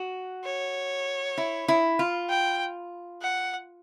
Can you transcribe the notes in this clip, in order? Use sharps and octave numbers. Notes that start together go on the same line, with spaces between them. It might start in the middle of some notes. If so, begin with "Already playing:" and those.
Already playing: F#4
C#5
E4
E4
F4
G5
F#5